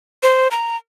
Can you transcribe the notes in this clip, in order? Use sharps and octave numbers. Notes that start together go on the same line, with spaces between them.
C5
A#5